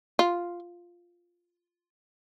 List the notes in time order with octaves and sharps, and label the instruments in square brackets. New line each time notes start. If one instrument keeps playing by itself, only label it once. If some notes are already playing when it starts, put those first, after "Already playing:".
[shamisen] F4